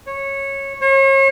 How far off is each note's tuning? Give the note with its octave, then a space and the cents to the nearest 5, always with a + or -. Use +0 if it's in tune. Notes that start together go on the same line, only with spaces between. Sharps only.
C#5 -15
C#5 -40